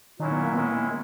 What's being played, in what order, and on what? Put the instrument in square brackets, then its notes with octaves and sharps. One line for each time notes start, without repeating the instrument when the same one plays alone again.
[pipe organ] A#2 F#3 C#4 E4 [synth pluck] D#3 D#4
[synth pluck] B3
A#3
[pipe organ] D#3 G#3 C#4 E4 [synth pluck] B3
[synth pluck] B3